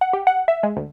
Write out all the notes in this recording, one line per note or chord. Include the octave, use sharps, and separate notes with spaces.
F#5
G4
F#5
E5
G#3
D2